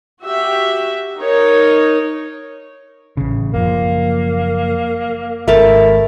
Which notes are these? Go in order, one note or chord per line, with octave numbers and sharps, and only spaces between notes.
F#4 G4 E5
D#4 A#4 C#5
A1 C#3
F#1 F3 A#3
G#1 A3 E4 A#4 A5